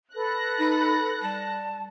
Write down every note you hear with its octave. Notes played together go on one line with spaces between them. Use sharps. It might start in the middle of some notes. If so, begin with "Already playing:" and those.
A4 B4 F#6 A#6
D#4 B5
G3 A5